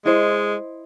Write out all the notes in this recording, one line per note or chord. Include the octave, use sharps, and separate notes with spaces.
G#3 E4 C5 D#5